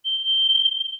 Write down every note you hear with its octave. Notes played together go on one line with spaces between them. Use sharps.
G7